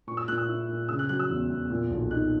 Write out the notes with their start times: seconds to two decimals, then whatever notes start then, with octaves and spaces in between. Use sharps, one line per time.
0.07 A#2 C#6
0.17 E6
0.28 A#2 F#6
0.38 E6
0.48 E4
0.69 A#2
0.89 C#3 E6
0.99 F#6
1.09 F#3 F#6
1.19 E6
1.29 E2
1.50 E2
1.70 A#2
1.91 B1
2.11 D#4 F#6